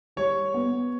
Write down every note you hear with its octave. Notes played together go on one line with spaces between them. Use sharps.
G3 C#5
B3